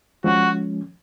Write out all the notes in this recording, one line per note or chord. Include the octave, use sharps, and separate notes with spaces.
F3 G#3 C#4 F#4